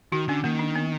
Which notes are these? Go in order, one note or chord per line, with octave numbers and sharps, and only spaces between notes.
D#3 F#4
D3 C#4
D#3 A#3
D4
B3